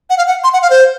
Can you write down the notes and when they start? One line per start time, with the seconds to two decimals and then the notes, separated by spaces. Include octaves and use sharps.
0.10 F#5
0.18 F5
0.27 F#5
0.44 C6
0.53 F#5
0.62 F5
0.70 C5